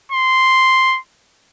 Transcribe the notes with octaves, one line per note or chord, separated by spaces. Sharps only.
C6